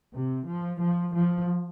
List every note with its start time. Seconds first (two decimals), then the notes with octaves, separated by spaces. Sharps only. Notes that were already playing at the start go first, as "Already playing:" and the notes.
0.14 C3
0.48 F3
0.81 F3
1.15 F3